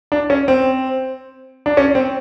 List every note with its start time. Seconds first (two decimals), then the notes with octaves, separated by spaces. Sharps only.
0.12 D4
0.30 C#4
0.48 C4
1.66 D4
1.77 C#4
1.95 C4